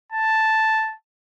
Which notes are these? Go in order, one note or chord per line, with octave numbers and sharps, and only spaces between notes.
A5